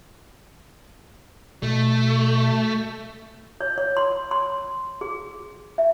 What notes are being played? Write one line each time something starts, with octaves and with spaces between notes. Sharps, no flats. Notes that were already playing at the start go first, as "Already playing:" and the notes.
B2 A3
C#5
C#5
C6
C6
G#4
E5